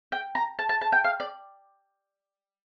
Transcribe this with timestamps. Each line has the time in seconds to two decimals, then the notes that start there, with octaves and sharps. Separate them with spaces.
0.12 G5
0.35 A#5
0.59 A5
0.69 A5
0.81 A5
0.92 G5
1.04 F5
1.20 D5